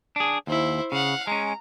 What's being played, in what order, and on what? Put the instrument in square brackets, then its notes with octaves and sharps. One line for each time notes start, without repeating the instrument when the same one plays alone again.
[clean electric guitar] D4 G#4
[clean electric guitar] D#2 [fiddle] E4 C5
[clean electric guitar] C#3 [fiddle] F5 F#5
[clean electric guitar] G#3 C#4 [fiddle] A#5